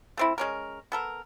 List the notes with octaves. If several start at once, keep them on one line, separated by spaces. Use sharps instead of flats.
A3 C4 E4
G#3 C#4 A#4
B3 A4 A#4